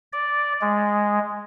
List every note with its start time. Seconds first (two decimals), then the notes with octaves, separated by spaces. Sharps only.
0.13 D5
0.61 G#3